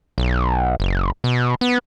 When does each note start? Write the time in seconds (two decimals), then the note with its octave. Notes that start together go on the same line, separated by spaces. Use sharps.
0.18 B1
0.80 F#1
1.24 B2
1.61 B3